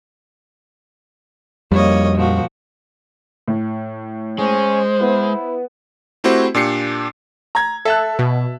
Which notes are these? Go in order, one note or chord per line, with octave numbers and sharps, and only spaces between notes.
F2 G3 A#3 C#5 D#5
A#2 F3 F#4
A2
G#3 C#4 C5
B3 E4
A3 C4 E4 F#4 G4 C5
A#2 D4 G4 C7 C#7
A#5 G#6
A4 E5 A5 F#6
B2